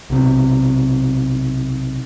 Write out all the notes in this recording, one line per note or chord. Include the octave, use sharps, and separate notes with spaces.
B1 C3